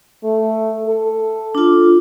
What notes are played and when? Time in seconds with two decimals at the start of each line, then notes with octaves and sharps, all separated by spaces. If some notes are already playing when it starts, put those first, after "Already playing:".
0.24 A3
0.87 A4
1.55 D4 F4